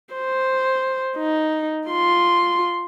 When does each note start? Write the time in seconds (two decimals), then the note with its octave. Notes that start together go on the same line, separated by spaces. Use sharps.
0.14 C5
1.17 D#4
1.88 F4 C6